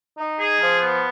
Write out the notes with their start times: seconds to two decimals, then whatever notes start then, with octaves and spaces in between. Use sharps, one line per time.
0.18 D#4
0.40 G#4
0.61 F3
0.81 B3